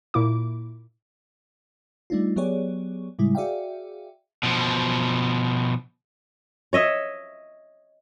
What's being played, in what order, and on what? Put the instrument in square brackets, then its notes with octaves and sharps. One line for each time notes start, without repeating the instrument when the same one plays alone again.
[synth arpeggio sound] A#2 E4 D6
[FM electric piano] G3 A3 D4 D#4 F4
F#3 B3 G4 G#4 C#5 D5
A2 C#3 G3 G#3 E4
F#4 G#4 D5 E5 F5 G5
[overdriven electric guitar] B2 F3
[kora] C#5 D#5 E5